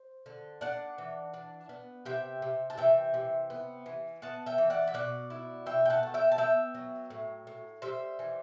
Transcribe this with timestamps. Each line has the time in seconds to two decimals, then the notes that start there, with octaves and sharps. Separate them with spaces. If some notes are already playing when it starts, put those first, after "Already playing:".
Already playing: C5
0.26 D3
0.61 D4 D5 F#5
0.98 E3
1.34 D4
1.69 B3
2.06 C3 E5 G5
2.42 C3
2.70 A5
2.77 E3 E5 G5
3.14 C3
3.50 B3
3.86 E3
4.22 B3 F#5 A5
4.46 E5 G5
4.58 E3
4.70 D5 F#5
4.87 E5
4.94 B2 D5 F#5
5.30 E4
5.66 B2 E5 G5
5.85 G5
5.90 F#5 A5
6.03 A3
6.14 E5 G5
6.32 A5
6.38 B3 E5 G5
6.75 F#3
7.10 A2
7.47 A2
7.82 G3 C5 E5
8.19 E3